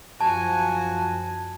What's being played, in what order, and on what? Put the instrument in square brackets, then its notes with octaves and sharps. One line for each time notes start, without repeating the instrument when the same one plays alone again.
[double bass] F#2 [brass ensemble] F3 [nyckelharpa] F#4 G#5 [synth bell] A5